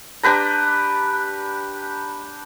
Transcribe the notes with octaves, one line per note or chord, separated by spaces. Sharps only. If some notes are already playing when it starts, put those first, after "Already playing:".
D4 G4 B4 A#5